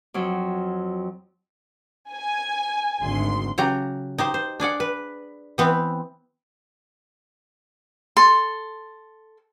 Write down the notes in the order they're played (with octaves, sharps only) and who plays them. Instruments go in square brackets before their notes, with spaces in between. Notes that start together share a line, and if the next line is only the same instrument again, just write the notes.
[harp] F2 F#3
[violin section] G#5
[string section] G#1 D2 C6
[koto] C#3 F#3 G4 A#5
D#4 G4 C5
C5
D4 G#4 D5 F#5
B4
E3 B3 C4
[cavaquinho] A4 C6